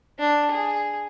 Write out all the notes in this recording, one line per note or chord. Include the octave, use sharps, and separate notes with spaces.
D4
G#4